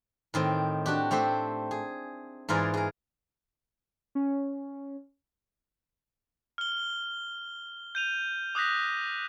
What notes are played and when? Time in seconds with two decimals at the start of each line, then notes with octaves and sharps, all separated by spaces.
0.34 A2 D#3 C4
0.86 D4 F#4 G4
1.11 A3 C4 G4 C5
1.71 G#4
2.49 G#2 E3 F4 G#4 A#4 D5
2.74 G#4 A#4
4.15 C#4
6.58 F6 G7
7.95 G6 D#7 F7
8.55 D6 D#6 F#6 G6 A#6 B6